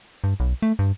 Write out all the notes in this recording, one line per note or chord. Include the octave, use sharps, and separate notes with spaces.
G2
B1
A3
G2